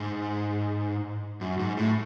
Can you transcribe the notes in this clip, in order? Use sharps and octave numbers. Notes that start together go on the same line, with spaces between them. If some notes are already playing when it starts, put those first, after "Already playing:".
Already playing: G#2
F#2
G#2
A2